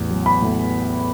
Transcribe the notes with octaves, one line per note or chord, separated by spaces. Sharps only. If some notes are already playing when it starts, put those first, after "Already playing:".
Already playing: A1 E2
F#3
B5
A2